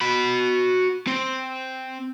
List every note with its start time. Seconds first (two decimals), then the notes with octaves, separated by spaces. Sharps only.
0.01 F#4 B5
1.07 C4